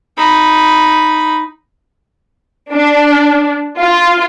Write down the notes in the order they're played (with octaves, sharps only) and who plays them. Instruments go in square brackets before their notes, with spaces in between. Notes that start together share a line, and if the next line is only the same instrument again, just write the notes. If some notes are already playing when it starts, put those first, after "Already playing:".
[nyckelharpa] D#4 B5
[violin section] D4
F4